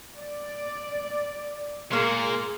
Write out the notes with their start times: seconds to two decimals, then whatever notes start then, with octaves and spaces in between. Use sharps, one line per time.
0.18 D5
1.91 A#2 G#3 A#3 G#4